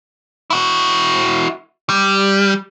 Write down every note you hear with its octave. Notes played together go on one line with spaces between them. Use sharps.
E4 F#4
G3